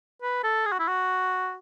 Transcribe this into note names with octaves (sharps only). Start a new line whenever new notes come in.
B4
A4
G#4
F#4
E4
F#4